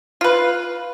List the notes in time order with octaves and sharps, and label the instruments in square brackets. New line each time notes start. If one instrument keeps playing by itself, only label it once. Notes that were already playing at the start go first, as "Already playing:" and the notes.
[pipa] F4 B4